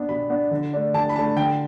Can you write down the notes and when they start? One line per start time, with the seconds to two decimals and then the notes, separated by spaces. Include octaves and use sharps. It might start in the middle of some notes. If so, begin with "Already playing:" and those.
Already playing: B3 D4
0.09 B2 B5
0.30 B3 D4
0.51 D3
0.73 A3 D4
0.94 D3 A5
1.09 B5
1.16 A3 D4 A5
1.36 D3 G5